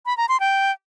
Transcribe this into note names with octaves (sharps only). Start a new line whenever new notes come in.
B5
A#5
C6
G5